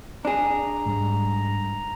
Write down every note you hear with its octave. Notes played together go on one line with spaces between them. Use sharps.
D4 G#4 A#5
G#2 G3